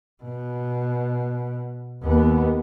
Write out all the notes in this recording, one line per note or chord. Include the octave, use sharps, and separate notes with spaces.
B2
D#2 B3